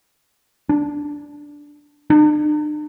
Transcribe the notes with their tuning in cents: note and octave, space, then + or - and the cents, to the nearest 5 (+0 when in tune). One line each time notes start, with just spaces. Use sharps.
D4 -5
D4 +45